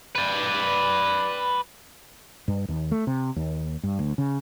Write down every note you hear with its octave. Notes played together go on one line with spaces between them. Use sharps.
B4 D5
G2
D#2
A3
C3
D#2
G2
D2
C#3